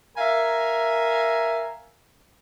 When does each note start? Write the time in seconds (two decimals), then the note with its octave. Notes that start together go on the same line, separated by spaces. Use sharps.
0.17 A#4 E5 F5 G#5 A#5